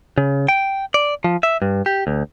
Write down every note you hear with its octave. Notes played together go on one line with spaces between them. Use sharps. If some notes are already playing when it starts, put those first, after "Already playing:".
C#3
G5
D5
F3
E5
G2
G4
D2